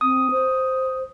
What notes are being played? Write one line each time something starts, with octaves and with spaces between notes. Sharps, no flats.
C4 D#6
C5